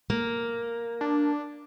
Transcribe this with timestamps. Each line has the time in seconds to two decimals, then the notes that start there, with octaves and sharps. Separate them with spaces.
0.10 A#3
1.01 D4